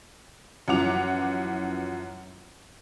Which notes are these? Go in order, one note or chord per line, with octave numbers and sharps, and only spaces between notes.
F#2 E3 F3 F#5 D6 F7